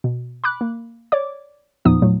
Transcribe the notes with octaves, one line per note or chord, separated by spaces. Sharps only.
B2
B5 D6 F#6
A#3
C#5 D5 D6
E2 A#2 F3 B3 D#4 D#6
A#2 F#3 A3